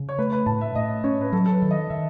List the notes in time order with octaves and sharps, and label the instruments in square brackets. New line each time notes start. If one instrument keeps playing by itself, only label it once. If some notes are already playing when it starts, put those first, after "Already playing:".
Already playing: [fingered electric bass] C#3
[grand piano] C#5
[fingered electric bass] A3 [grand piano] B4
[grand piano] B4
[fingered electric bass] A2 [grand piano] A5
[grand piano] E5
[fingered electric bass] A2 [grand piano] D#5
[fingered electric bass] C#4 [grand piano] C#5
[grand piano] B4
[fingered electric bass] F#3 [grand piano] A4
[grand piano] A4
B4
[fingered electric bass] D#3
[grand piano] D#5
[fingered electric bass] D#3 [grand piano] E5